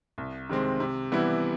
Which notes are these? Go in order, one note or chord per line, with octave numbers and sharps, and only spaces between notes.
C2
C3 D#3 G#3 C4
C3
E3 G3 B3 E4